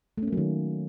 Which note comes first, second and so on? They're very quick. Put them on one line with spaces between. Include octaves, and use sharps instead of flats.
A3 C#4 A#3 F#3 D#3